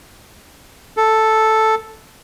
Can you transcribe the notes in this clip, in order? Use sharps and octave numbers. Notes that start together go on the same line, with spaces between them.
A4